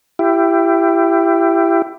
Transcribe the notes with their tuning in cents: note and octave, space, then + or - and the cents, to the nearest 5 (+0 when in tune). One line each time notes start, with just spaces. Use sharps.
E4 +25 G4 +0